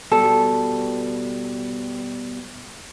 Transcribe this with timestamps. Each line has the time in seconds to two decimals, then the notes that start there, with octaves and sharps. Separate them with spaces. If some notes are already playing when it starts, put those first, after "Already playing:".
0.12 B2 G3 A4